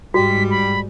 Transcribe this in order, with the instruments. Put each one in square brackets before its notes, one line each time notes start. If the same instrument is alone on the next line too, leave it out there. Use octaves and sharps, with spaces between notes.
[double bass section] G#2 [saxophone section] G3 [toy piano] F#4 [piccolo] B6
[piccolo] B5